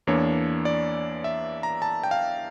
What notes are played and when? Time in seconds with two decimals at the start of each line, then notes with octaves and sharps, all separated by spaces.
0.07 E2 E3 A#3 D4 C#5
0.65 D5
1.24 E5
1.63 A#5
1.82 A5
2.03 G5
2.11 F5